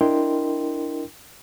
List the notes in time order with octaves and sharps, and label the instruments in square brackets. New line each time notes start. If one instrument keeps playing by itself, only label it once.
[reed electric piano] D4 E4 A#4 D#5 G5 C6